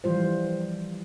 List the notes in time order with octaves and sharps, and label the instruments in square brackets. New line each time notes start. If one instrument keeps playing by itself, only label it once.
[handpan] E3 F3 G3 F4 C5